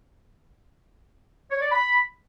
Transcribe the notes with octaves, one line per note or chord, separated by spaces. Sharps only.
C#5
D5
B5